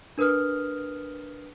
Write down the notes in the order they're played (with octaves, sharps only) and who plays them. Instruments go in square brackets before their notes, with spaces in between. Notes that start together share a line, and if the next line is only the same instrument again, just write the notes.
[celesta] D4 A#4 B4 D#6 F6